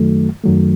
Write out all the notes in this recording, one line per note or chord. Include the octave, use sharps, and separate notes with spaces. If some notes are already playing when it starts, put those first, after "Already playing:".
Already playing: F#2 D#3 F#3 A3
F#2 D#3 F#3 A3